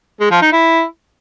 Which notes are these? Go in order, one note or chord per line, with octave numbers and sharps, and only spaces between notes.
G#3
F3
D#4
E4